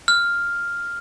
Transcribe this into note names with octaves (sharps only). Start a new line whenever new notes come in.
F6